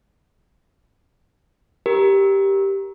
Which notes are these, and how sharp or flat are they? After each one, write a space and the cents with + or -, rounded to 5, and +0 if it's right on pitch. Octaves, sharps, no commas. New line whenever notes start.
G4 +0 A#4 +15